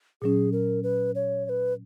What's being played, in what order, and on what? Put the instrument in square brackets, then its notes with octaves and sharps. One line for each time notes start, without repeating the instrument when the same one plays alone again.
[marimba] A#2 F#3 C#4 [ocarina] G#4
[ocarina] A#4
B4
C#5
C#5
B4